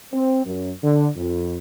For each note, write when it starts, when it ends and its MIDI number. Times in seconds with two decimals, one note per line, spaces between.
0.12 0.42 60
0.45 0.70 42
0.82 1.06 50
1.16 1.58 41